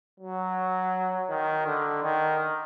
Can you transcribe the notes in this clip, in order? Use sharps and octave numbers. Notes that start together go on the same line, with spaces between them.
F#3
D#3
D3
D#3